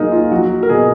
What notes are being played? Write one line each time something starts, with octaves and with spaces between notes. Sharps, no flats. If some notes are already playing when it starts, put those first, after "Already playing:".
Already playing: A#2 F#3 D#4 G#4 A#4
F4
F#3 F#4
A#4
B2 G#4